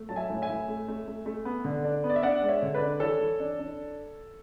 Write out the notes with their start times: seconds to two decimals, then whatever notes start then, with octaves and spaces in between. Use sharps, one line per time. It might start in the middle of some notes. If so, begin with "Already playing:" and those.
Already playing: A3
0.09 F#3 A5
0.16 E5 G#5
0.30 A2
0.42 E5 G#5
0.50 A2
0.68 A3
0.88 A3
1.08 A3
1.26 A3
1.45 B3
1.65 D3
1.84 D4
2.04 B3
2.10 D5
2.16 E5
2.23 D4 D5 F#5
2.42 G#3 D5
2.48 C#5 E5
2.62 D3
2.74 B4 D5
2.82 D4
3.00 E3 A4 C#5
3.19 E3
3.40 D4
3.59 D4